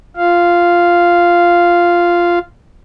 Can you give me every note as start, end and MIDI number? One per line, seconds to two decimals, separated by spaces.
0.17 2.39 65
0.17 2.39 77